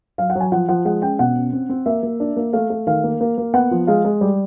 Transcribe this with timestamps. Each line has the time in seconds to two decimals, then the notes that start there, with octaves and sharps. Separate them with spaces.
0.18 F#3 F5
0.30 F#5
0.35 F#3 G#5
0.52 F3 F#5
0.69 F3 F#5
0.85 G#3 F#5
1.02 C#4 G5
1.19 B2 F#5
1.36 C#4
1.53 C4
1.69 C4
1.86 A#3 E5
2.03 A#3
2.20 D4
2.36 A#3
2.53 A3 F5
2.70 A3
2.87 D#3 F5
3.04 A#3
3.21 A#3
3.38 A#3
3.54 B3 F#5
3.71 F3
3.87 G#3 F5
4.05 G#3
4.21 G3